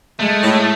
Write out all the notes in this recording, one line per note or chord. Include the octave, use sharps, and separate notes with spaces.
G#3 A3
A2